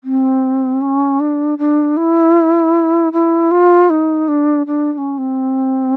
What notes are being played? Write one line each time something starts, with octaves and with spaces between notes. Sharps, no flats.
C4
C#4
D4
D4
E4
E4
F4
D#4
D4
D4
D4
C#4
C4